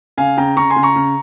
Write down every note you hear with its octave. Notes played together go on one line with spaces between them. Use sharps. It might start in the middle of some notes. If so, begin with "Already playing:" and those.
C#3 F5 G#5
C#3 G5 A#5
C#3 A#5 C#6
G#5 C6
C#3
A#5 C#6
C#3